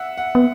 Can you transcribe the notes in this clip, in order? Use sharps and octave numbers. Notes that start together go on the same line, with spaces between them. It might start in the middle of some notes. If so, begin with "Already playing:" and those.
Already playing: E5 F#5
F#5
B3